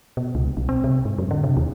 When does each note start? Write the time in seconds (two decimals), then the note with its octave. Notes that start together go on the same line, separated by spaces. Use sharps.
0.17 B2
0.35 C#2
0.57 B1
0.69 C4
0.84 C3
1.05 G#2
1.18 F#2
1.31 D3
1.44 C3
1.57 D#2